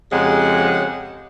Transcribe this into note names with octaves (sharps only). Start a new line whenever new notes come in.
F2 C#3 G#3 G4 F#5